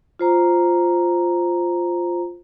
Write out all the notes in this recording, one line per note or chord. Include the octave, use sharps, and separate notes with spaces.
F4 C5 A#5